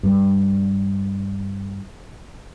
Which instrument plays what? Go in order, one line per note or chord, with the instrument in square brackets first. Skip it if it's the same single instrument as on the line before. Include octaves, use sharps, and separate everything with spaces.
[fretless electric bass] G2 G3